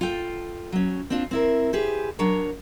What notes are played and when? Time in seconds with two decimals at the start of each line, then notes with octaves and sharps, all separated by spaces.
0.01 F4 A4 G5
0.72 F#3 C#4
1.10 C4 D4 F4
1.31 C4 E4 A#4
1.73 G4 G#4 B4 C5
2.19 F#3 D4 A#4 C#5 A#5